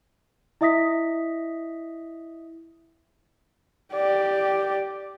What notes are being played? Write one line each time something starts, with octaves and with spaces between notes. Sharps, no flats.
E4 D#5 E5 D#6 A#6 B6
G4 D5